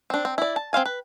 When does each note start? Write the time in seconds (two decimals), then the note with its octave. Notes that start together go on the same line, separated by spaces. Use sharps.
0.10 C4 D4
0.25 C4
0.38 E4 D5
0.56 A5
0.73 C4 C5 F5 G#5
0.86 B4